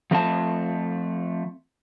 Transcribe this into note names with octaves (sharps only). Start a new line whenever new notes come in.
F3 A3 C4 F5 A5